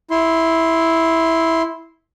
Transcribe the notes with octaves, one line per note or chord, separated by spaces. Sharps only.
E4 C6